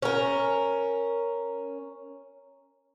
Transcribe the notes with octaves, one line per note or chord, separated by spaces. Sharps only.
C#4 A#4